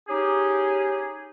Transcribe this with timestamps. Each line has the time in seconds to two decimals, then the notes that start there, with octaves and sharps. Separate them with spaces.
0.08 C#4 D#4 G4 G#4